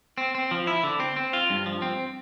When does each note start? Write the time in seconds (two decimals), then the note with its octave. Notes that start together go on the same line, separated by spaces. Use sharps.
0.18 C4
0.35 C4
0.51 F3
0.67 E4
0.84 D3
1.00 C4
1.16 C4
1.33 F4
1.50 G2
1.66 F3
1.82 C4